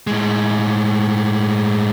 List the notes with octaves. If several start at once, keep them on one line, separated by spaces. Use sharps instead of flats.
A2 G#3